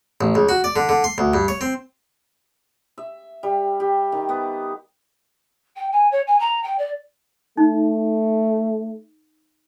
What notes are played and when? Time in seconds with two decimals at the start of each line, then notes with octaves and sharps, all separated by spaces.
0.21 A1
0.35 C#2
0.49 F#4
0.64 D5
0.76 D3
0.89 D3
1.04 C6
1.18 D2
1.34 G2
1.48 C#5
1.61 C4
2.98 E5
3.43 G3
3.80 G4
4.12 D#3
4.29 B3
5.76 G5
5.92 G#5
6.11 C#5
6.27 G#5
6.39 A#5
6.63 G5
6.78 D5
7.57 A3 D#4